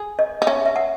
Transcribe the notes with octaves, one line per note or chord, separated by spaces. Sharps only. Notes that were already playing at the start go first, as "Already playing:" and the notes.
Already playing: G#4
D#5
D#4
C#4 E5
E5
F#5